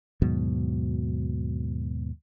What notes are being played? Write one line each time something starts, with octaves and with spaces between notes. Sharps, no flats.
D#2 G#2 B2 F#3